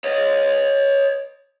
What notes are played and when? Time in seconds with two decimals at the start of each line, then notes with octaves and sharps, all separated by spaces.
0.04 C#5 D#5